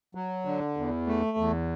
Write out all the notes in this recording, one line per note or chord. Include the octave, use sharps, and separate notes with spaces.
F#3
D3
E2
A3
E2